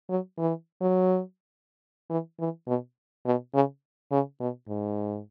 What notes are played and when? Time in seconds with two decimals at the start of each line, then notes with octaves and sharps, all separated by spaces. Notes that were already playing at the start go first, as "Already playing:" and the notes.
0.09 F#3
0.38 E3
0.81 F#3
2.10 E3
2.40 E3
2.67 B2
3.25 B2
3.54 C#3
4.11 C#3
4.40 B2
4.68 G#2